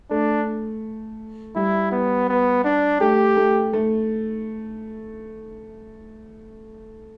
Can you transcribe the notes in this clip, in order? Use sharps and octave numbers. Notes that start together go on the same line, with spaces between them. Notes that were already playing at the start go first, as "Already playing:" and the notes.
A3 D4
G3 E4
B3
B3
D4
A3 G4
A3
A3